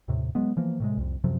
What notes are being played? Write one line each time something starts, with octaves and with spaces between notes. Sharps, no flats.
D#2 A2 C3
F#3 G#3 B3
E3 F3 A#3
A2 C3 G#3
C2 F2
F#2 C3 F3 F#3